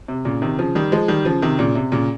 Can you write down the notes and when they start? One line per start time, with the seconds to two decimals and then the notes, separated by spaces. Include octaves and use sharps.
0.08 C3
0.25 A#2 C#3
0.42 C3 D#3
0.59 C#3 F3
0.75 D#3 G3
0.92 F3 G#3
1.08 D#3 G3
1.25 C#3 F3
1.42 C3 D#3
1.59 A#2 C#3
1.75 C3
1.92 A#2 C#3